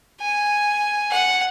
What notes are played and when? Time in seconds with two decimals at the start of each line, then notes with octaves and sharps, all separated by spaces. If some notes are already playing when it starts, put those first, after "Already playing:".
0.21 G#5
1.10 F#5